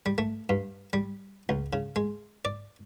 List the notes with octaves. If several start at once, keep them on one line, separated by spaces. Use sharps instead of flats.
G3
A3
G2
G3
C#2
C#3
G#3
D5